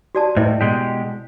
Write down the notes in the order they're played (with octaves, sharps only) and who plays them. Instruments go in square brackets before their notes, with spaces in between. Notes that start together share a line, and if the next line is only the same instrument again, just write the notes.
[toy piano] F#4 D5 A5
[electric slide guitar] A2 [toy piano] E4 C5 D#5
[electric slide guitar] B2 G#3 G4